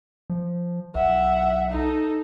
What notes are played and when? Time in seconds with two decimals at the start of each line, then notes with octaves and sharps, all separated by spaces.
0.30 F3
0.95 B1 E5 F#5
1.70 D#4 A4